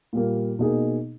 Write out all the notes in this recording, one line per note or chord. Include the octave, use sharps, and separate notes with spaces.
A#2 G3 A#3
B2 A#3 D#4 G#4